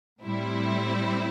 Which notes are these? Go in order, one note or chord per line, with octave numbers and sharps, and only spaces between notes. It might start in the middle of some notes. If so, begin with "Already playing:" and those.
A2 G3 C4 E4